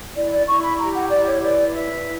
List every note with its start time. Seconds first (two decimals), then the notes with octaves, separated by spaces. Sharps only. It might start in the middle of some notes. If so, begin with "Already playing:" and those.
0.15 E4 D5
0.31 D5
0.47 E4 C#6
0.62 B5
0.78 G4 A#5
0.95 F#5
1.10 E4 D5
1.26 C#5
1.42 B4 D5
1.73 B4 E5
2.04 E4